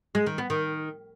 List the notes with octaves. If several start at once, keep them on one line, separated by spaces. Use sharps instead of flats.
G#3
D#3
B3
D#3